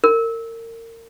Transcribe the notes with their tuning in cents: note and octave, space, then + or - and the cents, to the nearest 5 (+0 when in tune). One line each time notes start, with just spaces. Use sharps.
A#4 -30